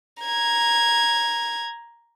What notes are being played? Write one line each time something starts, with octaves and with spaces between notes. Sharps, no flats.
A#5 G#6